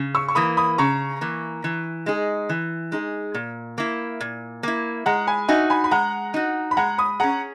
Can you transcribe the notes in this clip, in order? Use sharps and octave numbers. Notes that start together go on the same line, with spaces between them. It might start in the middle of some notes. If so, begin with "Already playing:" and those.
Already playing: C#3
C#6 E6
C#6
E3 A#3 B5 D#6
B5 D#6
C#3 A#5 C#6
E3 A#3
E3
G#3 D#4 G#4
E3
G#3 D#4 G#4
A#2
A#3 E4
A#2
A#3 E4
G#3 F#5 A#5
G#5 B5
D#4 F#4 E5 G#5
G#5 B5
B5
G#3 F#5 A#5
D#4 F#4
B5
G#3 F#5 A#5
B5 D#6
C#4 G#4 F#5 A#5